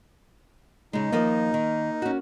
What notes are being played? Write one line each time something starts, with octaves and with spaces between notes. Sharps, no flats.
C#3 G#3 D#4
D#2 F3 A#3 D#5
D#3
C#4 F#4